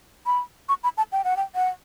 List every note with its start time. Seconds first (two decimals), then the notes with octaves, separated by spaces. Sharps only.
0.26 B5
0.69 C#6
0.84 B5
0.97 A5
1.12 G5
1.24 F#5
1.37 G5
1.55 F#5